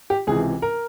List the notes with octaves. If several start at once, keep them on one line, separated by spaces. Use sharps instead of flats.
G4
C#2 C3 E3 G#4
A#4